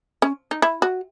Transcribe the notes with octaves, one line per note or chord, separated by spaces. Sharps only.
C#4
D#4
E4
F#4